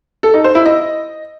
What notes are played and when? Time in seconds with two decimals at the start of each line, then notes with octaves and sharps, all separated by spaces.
0.23 A4
0.34 D#4
0.44 C5
0.55 E4
0.66 D#5